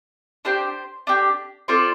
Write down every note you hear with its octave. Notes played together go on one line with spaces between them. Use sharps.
D4 G4 C5
D4 G4
C4 F4 A4 D5